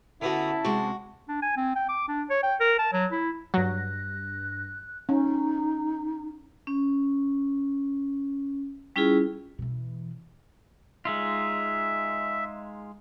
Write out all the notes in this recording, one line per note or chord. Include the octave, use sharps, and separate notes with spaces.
D3 B3 C#4 E4 F#4 A5
C3 G#3 F#4
D4
G#5
C4
G5
D6
D4
C#5
G5
A#4
A5
F#3
E4
G2 F#3 F#6 A#6
C#4 D#4
C#4
G3 C#4 E4 F4 G#4
B2 E3
G#3 D#4 F4 E5